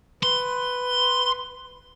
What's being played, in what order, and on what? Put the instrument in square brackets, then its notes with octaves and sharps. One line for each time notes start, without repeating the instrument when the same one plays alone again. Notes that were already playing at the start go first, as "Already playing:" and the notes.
[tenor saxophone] B4 [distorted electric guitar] C6